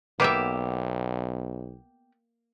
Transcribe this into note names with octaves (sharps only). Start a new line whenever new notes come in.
B1 A#3 B3 G4 E5